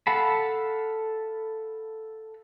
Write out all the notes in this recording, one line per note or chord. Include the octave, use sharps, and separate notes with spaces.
A4 F5 F#5 A5 B5